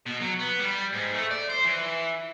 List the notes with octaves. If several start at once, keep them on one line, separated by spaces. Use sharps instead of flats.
B2
F#3
B3
G3
G#2
A3
D5
C5
E3